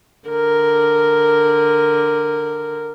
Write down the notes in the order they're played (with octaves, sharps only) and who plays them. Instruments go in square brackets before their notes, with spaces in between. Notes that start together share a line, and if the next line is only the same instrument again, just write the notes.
[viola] D3 A#4